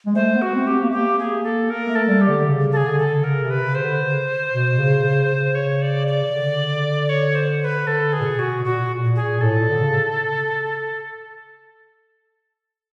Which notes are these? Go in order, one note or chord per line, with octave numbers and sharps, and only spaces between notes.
G#3
A3 C5
B3
F#4
C4
G4
B3
A#3
A3
A#3 G4
G#4
A4
A#3 A#4
A3
A4
G3
G4
D3
C#3
C#3
A4
G#4
D3
A4
D3
C#3 A#4
C3
B4
C#3
C5
D3
C#3
B2
C#3
C#3
C#3
C#5
D5
D5
C#3
D3
C#5
C5
C5
B4
D3 A4
G#4
A#2
B2
F#4
B2
A#2 F#4
A#2
A#2
G#4
A#2
A2 A4
A#2
D3
C#3